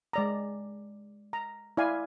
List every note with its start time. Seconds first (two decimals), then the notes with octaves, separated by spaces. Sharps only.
0.13 G#3 D5 A#5
1.33 A#5
1.77 E4 D5 F5 G#5